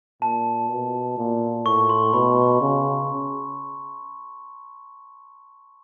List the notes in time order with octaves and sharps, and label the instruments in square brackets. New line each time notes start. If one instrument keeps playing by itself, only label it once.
[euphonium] A#2 [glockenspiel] A5
[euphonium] B2
A#2
[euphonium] A2 [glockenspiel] C#6
[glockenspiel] C6
[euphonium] B2 [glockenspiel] B5
[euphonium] C#3